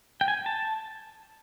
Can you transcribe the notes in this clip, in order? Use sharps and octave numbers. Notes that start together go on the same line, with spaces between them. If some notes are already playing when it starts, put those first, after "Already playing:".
G5
G#5
A5